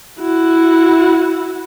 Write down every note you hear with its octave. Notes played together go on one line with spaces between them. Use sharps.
E4 F#4